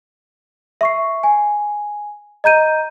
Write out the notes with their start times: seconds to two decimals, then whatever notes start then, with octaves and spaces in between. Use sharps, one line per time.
0.81 E5 C#6 C7
1.23 G#5
2.44 D#5 A#5 G6 D#7